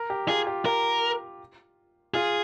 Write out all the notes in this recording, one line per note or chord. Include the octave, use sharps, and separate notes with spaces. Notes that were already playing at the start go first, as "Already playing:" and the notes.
Already playing: A#4
G4
F4 G#4
G4
A#4
F4 G#4